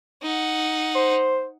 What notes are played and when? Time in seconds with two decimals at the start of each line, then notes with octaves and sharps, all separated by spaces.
0.23 D#4 F#5
0.95 C5